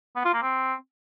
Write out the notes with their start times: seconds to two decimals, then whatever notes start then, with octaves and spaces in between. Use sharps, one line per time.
0.16 B3
0.25 F4
0.34 A#3
0.42 C4